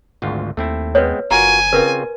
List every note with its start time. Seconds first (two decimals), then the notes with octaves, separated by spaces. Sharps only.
0.22 G#1 D2 F4
0.57 D#2 A3 C4 E4
0.95 G#3 B3 C4 B4 C#5
1.31 F#1 F4 F#4 A#4 G#5 A#5
1.73 C#3 C4 F4 A#4 B4